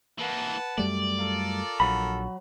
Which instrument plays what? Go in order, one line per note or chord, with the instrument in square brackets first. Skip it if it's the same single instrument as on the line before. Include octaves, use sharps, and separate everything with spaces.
[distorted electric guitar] E3 A#3 [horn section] B4 F#5 A5
[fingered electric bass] F#2 G3 A3 [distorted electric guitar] D5
[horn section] F4 A4 A#4
[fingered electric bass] A#1 [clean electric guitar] F#3 B5